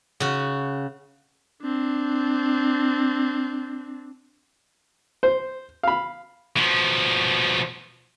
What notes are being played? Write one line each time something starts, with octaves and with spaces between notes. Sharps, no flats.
C#3 F#4
C4 D4
C5
F5 B5
B2 F3